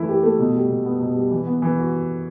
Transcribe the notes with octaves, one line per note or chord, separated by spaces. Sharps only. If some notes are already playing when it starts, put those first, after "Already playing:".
Already playing: E3 A3 E4
G4
A3
B2
G3
B2
B3
B2
G3
E3
B3
E3
F#4